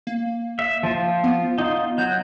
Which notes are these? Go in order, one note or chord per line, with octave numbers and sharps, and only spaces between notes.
A#3
E5
F3 F4
B3
D#4 F4
F#3 G6